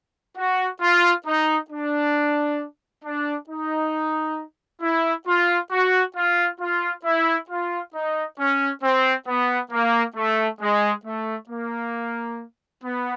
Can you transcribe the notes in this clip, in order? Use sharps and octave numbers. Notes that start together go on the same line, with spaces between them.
F#4
F4
D#4
D4
D4
D#4
E4
F4
F#4
F4
F4
E4
F4
D#4
C#4
C4
B3
A#3
A3
G#3
A3
A#3
B3